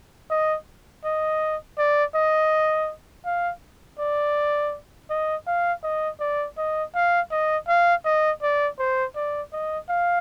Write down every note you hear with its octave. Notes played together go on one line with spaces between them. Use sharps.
D#5
D#5
D5
D#5
F5
D5
D#5
F5
D#5
D5
D#5
F5
D#5
F5
D#5
D5
C5
D5
D#5
F5